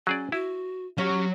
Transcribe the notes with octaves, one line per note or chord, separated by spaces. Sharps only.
F#3 C#4 G#4 D5
E4 F#4
F#3 C#4 G4 C#5